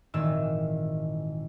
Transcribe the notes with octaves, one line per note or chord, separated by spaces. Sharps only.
G#1 A#2 D#3 E3 E6